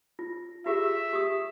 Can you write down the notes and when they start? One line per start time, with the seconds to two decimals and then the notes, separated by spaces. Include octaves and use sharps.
0.19 F4
0.66 F4 G4 G#4 E5
1.13 G4 D#6